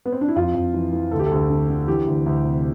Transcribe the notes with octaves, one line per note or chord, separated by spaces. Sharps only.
B3
C4
D4
E4
F2 F4
F2
E3
E3
D2 A4
G4
A4
D2
D3
D3
E3 G4
D2
D2
C3